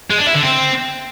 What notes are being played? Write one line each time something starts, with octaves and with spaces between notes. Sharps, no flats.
G#3
D4
E4
D3
C4